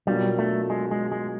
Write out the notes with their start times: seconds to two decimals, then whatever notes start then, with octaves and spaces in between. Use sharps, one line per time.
0.07 B2 F#3 G3 A#3 D4 F4
0.39 A3
0.70 G#3
0.91 G#3
1.12 G#3